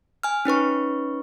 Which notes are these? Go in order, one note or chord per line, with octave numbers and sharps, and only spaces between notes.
G#5 F6
C#4 D#4 B4 C#6